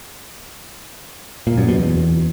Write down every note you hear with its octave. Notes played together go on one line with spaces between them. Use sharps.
A#2
F#2
B2
E2